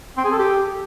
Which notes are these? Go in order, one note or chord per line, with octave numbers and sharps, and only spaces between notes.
C4
G#4
A4
G4